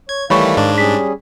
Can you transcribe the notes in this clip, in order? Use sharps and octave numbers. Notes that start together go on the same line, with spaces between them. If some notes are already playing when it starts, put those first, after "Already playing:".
C#5 G#6
D#3 E3 G3 A3 C#5 F5 B5 C#6
G#2 D4
G3 C#4 G#4 B6